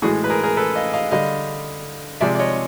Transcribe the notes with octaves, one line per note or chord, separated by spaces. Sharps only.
A2 E3 G#3 F#4 G#4
B4
G#4 A#4
G#4 A#4
A4 B4
D#5 F5
D#5 F5
D3 G3 D#5 F5
C3 F3 G#3 D5 E5
D5
C#5 D#5